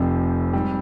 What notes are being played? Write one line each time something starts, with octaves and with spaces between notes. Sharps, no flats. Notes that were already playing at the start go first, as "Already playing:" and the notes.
Already playing: F1 F2 C3 F3 C4
G#2 G3 C4